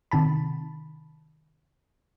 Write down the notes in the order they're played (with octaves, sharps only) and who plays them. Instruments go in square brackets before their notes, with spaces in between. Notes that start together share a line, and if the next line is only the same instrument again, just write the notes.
[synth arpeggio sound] C3 D#3 A5 B5